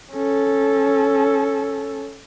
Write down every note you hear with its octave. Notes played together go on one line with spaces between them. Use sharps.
C#4 A4